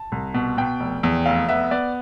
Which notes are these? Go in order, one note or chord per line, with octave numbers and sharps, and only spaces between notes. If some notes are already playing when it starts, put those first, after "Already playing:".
Already playing: A5
C2
B2
B2 G5
F1
E2
F1 F5
B3 E5
B3 D5